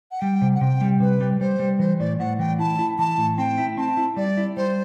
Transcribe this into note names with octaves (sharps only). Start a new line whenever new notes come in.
F#5
G3 G5
C3
F#5
C3 G5
G3
C3 B4
G3
G3 C5
G3
E3 C5
A2 D5
A2 F#5
E3 G5
E4 A5
E4
E3 A5
A2
C4 G5
E4
C4 A5
E4
G3 D5
E4
G3 C5